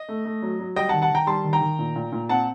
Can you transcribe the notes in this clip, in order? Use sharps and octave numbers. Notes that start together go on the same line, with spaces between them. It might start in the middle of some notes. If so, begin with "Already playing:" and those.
Already playing: D#5
A3
A3
F#3
F#3
G3 D#5 G5
F#5 A5
D#3
F#5 A5
D#3 G5 A#5
G3 A5 C6
D#3
G5 A#5
D#3
A#2
A#2
A#2
C4 F#5 A5